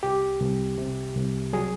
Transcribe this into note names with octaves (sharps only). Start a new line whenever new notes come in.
C2 G4
C2
C3
C2
F#3 G#4